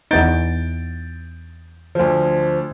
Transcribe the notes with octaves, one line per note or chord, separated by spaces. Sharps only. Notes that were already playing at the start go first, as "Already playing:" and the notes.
E2 B3 D#4 G6 A6 D7
D2 F3